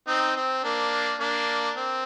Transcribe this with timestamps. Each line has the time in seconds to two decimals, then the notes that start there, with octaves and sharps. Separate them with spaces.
0.07 C4 D#4
0.37 C4
0.63 A#3 D4
1.20 A#3 D4
1.76 C4